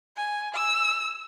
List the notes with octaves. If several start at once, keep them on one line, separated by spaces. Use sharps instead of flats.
G#5
E6